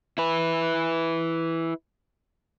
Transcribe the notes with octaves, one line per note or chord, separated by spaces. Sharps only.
E4 B4